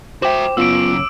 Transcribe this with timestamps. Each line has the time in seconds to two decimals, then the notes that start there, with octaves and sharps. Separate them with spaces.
0.22 F#4 C5 E5 G5 D6 E7
0.57 F#2 C#3 B3 F4 E6 D7